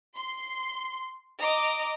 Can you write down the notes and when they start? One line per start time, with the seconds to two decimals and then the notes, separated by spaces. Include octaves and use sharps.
0.16 C6
1.41 D#5 A#5 D6